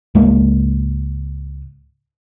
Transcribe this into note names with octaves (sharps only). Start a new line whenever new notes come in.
C#2 G#2 G#3 A#3